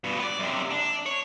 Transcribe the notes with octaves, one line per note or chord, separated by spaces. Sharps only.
G2 B2
B4 D5
F#2 C3
D4
C#5